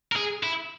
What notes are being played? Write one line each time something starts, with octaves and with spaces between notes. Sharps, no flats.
A#4
G#4
E4